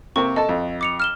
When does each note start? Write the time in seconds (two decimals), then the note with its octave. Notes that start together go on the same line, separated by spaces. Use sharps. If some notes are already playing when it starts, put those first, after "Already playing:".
0.16 C3 A#3 C4 C#6
0.36 A4 D#5 A5
0.49 F2
0.81 D6 C#7 F7
1.00 F6 E7 G7